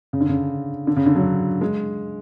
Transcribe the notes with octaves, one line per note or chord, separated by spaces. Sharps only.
C#3
D3
C#3
D3
C#3
D3
F#3
G#3